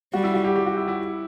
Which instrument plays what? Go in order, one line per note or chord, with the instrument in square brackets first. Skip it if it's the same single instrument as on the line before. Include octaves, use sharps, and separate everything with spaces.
[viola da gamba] G3 [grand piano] F#4
[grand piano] E4
F#4
G4
G4
F#4
E4
E4